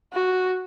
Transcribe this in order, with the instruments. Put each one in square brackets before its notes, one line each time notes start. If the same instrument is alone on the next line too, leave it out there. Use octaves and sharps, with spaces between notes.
[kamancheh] F#4